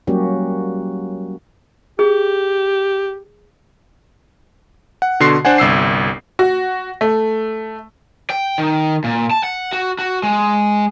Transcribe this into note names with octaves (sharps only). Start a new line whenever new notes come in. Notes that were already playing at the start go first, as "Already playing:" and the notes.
F#3 G3 A#3 C#4 F#4 G4
G4 G#4
F#5
B2 D3 F#4 C6 C7
D4 C5 D5 F#5 G#5
G1 C2 E6 C7
F#4
A3
G5
D#3
A#2
A5
F#5
F#4
F#4
G#3